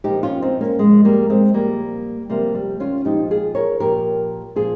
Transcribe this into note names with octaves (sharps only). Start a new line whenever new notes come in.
A#2 F3 D#4 G4
C#4 F4
C4 D#4
A#3 C#4
A#2 F3 G#3
G3 A#3
G#3 C4
A#2 F3 G3 A#3
C3 F3 G3 A#3
G3
C#4 F4
A#2 F3 D#4 G4
F4 G#4
A#4 C#5
A#2 F3 G4 A#4
A#2 F3 F4 G#4